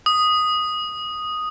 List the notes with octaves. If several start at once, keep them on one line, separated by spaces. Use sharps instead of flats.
D#6